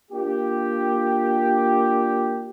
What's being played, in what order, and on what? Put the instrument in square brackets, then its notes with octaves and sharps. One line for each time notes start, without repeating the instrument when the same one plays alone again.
[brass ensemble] A#3 D4 F4 G4